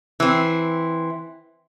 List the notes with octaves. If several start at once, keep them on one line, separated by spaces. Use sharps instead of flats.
E3 C4